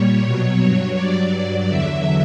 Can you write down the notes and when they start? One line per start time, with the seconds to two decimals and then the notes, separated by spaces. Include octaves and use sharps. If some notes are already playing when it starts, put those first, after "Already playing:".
Already playing: A#2 G3 C#5
0.24 B2 F#3
0.60 G2 F#3 C#5
0.96 G2 F#3 D5
1.33 G2 F#3
1.68 E2 D3 F#3 E5